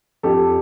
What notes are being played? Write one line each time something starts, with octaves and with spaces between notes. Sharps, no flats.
F2 G4 A4